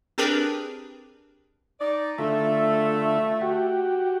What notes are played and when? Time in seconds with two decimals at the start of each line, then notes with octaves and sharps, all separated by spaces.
0.18 C4 D4 G4 G#4 A#4 B4
1.80 D#4 D5
2.18 D3 A3 F4 E5
3.41 F#4 G4